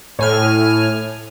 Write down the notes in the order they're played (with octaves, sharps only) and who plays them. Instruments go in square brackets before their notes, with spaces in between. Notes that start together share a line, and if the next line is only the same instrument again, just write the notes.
[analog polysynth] A2 G#5 F6